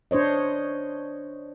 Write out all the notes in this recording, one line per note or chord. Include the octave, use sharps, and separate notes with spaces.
D4 C5 C#5 D#5